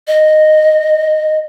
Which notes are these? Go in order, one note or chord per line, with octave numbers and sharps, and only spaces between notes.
D#5